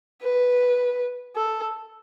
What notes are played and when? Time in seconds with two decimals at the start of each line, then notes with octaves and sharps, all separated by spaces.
0.23 B4
1.36 A4